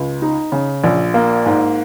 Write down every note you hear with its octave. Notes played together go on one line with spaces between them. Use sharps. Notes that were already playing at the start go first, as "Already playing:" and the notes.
Already playing: C#2
D#4
C#3
A#1
A#3
G#2